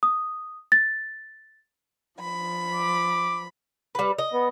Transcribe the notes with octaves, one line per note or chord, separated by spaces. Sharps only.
D#6
A6
F3 B5
D6
G3 B4
D#5
B3